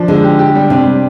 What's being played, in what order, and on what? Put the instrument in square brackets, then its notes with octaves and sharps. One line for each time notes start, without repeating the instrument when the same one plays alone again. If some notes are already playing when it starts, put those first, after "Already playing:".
Already playing: [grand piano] F3 D4
[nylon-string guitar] D3 [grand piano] G#3
[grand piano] G4
G4
G3
[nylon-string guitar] C3 [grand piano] D4
[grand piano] G3